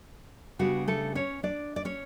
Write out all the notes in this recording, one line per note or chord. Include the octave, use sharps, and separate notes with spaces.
C#3 G3 B3 D4 F#4
A3 A4
C#4 C#5
D4 D5
D5
C#4 C#5